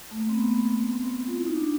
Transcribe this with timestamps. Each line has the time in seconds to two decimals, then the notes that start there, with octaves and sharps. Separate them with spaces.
0.11 A3
0.20 A#3
0.29 C4
0.34 B3
0.49 B3
0.78 B3
0.92 C4
1.28 F4
1.38 E4
1.47 D#4
1.56 D4